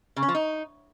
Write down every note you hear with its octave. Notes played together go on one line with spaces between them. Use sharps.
C#3
C#4
F3
D#4